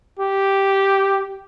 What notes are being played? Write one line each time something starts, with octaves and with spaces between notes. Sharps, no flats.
G4